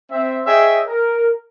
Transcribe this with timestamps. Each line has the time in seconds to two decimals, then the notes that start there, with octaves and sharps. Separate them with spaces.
0.11 C4 E5
0.46 G#4 C#5 D#5 E5 G5
0.87 A#4